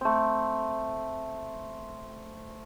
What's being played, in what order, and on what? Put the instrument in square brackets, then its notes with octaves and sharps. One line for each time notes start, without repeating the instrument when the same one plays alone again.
[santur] A3 C4